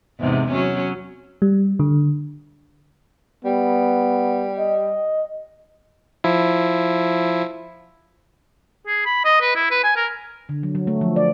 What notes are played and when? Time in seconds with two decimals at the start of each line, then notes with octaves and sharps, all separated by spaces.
0.19 E2 G#2 C3
0.52 F#3 C#4
1.42 G3
1.79 D3
3.45 G3 B3
4.58 D#5
6.24 F3 E4
8.87 G#4
9.06 B5
9.25 D#5
9.42 B4
9.56 E4
9.71 B4
9.84 G#5
9.96 A#4
10.49 D3
10.63 F#3
10.75 F#3
10.87 A3
11.01 F3
11.16 D5